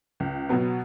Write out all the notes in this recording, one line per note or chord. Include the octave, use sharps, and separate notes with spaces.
C#2
B2 F#3 B3